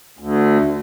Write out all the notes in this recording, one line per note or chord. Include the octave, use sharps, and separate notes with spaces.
D2